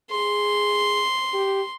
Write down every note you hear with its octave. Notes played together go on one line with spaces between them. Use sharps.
G#4 C6
G4